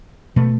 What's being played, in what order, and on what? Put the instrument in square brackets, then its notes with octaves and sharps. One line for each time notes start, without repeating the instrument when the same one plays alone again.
[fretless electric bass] B2 A3